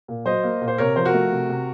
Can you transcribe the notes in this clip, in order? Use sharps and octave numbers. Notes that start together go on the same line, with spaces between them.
A#2
F#3 C5 D#5
A#3
A#2
C5
C3 A#4 C#5
F3 C5
F#4 A#4
A3
C3
C3